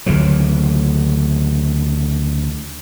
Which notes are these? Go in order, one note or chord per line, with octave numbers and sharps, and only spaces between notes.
D2 C#3 E3 F#3